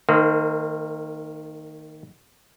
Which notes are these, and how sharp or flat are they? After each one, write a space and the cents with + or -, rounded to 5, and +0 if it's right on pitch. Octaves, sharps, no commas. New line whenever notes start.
D#3 +0 A#3 -40 C5 -20